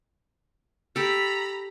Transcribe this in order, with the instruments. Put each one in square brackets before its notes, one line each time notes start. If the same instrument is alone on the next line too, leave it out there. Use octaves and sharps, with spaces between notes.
[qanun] G4 A4 [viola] A#5 B5